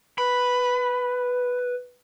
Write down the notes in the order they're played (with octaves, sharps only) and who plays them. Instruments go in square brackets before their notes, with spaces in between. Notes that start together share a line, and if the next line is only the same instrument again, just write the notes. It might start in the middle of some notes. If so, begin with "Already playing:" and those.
[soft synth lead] B4 [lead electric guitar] B5